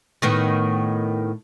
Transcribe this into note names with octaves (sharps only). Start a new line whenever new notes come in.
A2 D#3 B3